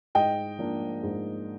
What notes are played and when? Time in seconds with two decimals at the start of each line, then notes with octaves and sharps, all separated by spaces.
0.15 G#2 D#5 G5
0.59 F3 A#3 D4
1.03 G#2